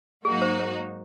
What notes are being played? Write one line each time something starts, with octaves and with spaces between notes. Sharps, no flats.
G#2 F#3 A#3 D#4 F#4 G#4
C5
C5